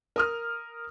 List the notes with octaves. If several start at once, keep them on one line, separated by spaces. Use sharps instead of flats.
A#4 D#6 F6